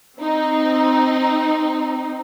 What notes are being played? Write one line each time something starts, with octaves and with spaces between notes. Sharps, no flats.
C4 D#4